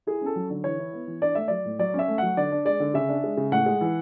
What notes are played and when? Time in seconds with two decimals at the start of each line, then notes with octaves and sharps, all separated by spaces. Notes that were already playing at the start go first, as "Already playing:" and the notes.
0.07 E4 G#4
0.22 C#4 A4
0.36 F#3
0.50 D3
0.64 E3 C#5
0.79 E4
0.93 B3
1.07 E3
1.22 D4 D5
1.35 A3 E5
1.48 F#3 D5
1.65 A2
1.79 F#3 D5
1.94 C#4
1.99 E5
2.08 A3
2.18 F#3 F#5
2.37 D3 D5
2.52 D4
2.65 G#3 D5
2.80 D3
2.94 C#3 E5
3.09 D4
3.24 G#3
3.37 C#3
3.52 A2 F#5
3.66 G#3
3.81 E3